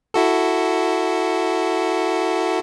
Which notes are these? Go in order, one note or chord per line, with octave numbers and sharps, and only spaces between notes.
E4 F#4 A4